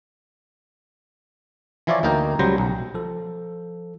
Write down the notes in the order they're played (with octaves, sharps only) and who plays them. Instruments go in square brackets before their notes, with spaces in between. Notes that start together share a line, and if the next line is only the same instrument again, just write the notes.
[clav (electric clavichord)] E3 F3 E4 F4 C#5 D5
D2 A#3 D#4 A#4 G5
C#2 F#3 G3 C5 A#5
B1
[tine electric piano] F3 A4